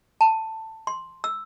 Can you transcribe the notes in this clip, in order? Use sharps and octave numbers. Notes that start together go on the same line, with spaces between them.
A5
C6
E6